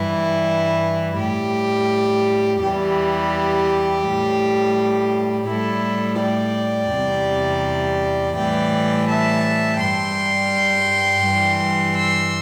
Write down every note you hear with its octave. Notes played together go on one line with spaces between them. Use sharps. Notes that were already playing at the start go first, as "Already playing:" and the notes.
Already playing: G2 E3 G3 E4
A2 G3 G4
E2 E3 G3 G4
A2 G3
A2 G3 E4 A4
D5 G5
E2 C3 G3
A2 E3 G3 D5 G5
E5 A5
G2 G3 G5 C6
G2 E3 G3
C6 E6